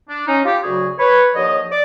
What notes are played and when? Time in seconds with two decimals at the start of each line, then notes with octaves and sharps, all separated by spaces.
0.09 D4
0.27 C#4 D#4
0.44 F4 G4
0.62 D2 C#3 F#3 F#4 G#4
0.98 B4 C#5
1.34 D#2 D3 F3 C#5 D#5
1.70 D5